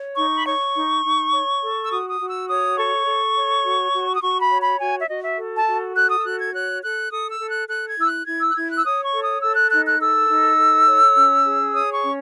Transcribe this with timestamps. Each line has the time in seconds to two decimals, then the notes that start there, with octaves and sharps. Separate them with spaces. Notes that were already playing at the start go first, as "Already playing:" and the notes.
Already playing: C#5
0.17 D#4 C#6
0.35 B5
0.46 C#5 C#6
0.75 D#4
1.04 D#4
1.32 C#5
1.62 A4
1.85 E6
1.91 F#4 D#6
2.10 D#6
2.20 F#4
2.30 E6
2.49 C#5 D#6
2.77 A4 C#6
3.06 A4
3.35 C#5
3.64 F#4
3.93 F#4
4.15 D#6
4.21 F#4 C#6
4.41 B5
4.51 C#5
4.61 B5
4.80 F#4 G#5
5.00 E5
5.09 F#4 D#5
5.23 E5
5.38 A4
5.57 A5
5.67 F#4
5.95 A4 F#6
6.10 D#6
6.19 E6
6.24 F#4 F#6
6.39 G#6
6.53 C#5 F#6
6.82 A4 F#6
7.11 A4 D#6
7.30 E6
7.40 A4
7.50 F#6
7.69 A4 F#6
7.88 G#6
7.98 E4 E6
8.07 F#6
8.26 E4 G#6
8.41 E6
8.51 F#6
8.56 E4 G#6
8.70 F#6
8.78 E6
8.84 C#5 D#6
9.04 C#6
9.13 A4
9.23 D#6
9.42 A4 E6
9.56 F#6
9.71 D#4 F#6
9.85 F#6
10.00 A4 E6
10.29 D#4
10.58 A4
10.87 C#5
11.15 C#4
11.44 G#4
11.73 C#5 D#6
11.92 C#6
12.02 C#4